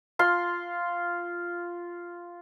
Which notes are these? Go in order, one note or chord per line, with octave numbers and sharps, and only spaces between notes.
F4 C6